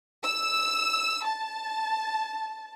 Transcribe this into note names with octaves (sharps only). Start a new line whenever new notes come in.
E6
A5